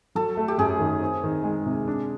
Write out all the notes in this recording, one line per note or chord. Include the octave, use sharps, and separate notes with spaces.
F#3 A4
A3
G4
F#2 G#4
D#3
C4
D#3
G#3
C3
D4